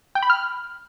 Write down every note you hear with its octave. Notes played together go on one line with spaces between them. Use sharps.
G5
B5
F6